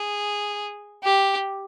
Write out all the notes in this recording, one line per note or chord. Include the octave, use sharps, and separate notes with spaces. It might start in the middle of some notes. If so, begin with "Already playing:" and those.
Already playing: G#4
G4